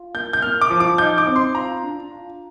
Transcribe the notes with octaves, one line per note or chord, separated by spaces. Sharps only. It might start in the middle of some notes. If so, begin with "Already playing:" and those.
Already playing: F4
A#3 G6
G6
A#3 F6
D6
F3
D6
D#4 G6
D6
C4
C6
F4 A#5
D4
F4